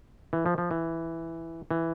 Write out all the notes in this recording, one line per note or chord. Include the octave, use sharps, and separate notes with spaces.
E3
F3
F3
E3
E3